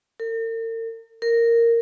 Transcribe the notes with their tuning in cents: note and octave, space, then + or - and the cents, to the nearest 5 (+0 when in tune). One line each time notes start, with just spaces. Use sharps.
A#4 -45
A#4 -5